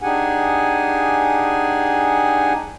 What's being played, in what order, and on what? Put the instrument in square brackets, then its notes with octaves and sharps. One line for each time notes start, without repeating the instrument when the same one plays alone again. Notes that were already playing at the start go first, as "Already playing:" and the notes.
[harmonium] D4 D#4 G4 G#4 F#5 G#5